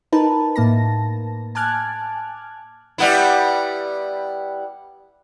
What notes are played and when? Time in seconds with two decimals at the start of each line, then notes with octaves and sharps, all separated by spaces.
0.13 D#4 A#4 B4 A5
0.56 A2 A#3 A5 A#6
1.55 G#5 A5 D6 F6 F#6 G#6
2.98 G3 B3 E4